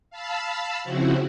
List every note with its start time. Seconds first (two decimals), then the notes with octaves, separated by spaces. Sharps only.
0.10 F5 A5 B5 E6
0.84 C#3 F3 C4 E4 F#4